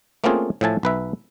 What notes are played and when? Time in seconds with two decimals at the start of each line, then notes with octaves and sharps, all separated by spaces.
0.24 A3 A#3 C4 C#4 F4 G#4
0.61 A2 F3 E5 G#5 A5
0.83 B1 B4 E5